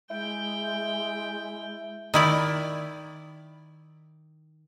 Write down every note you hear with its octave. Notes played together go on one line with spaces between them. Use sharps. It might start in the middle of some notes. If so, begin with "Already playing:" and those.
G#3 E4 G5
D#3 E4 D5